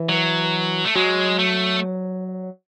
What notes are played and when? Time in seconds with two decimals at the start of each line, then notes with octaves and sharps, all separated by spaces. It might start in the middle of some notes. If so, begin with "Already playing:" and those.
Already playing: E3
0.09 F#3
0.85 A3
0.95 F#3 G#3
1.39 A3